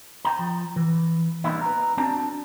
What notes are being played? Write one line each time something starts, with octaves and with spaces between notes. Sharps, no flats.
G5 A#5
F3
E3
G3 A#3 B3 D#4 E4
B4 A#5
C4 D4 F#4 D5 A5 A#5